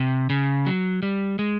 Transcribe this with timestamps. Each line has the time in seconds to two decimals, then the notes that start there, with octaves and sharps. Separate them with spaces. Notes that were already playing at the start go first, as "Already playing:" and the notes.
Already playing: C3
0.30 C#3
0.66 F#3
1.03 G3
1.39 G#3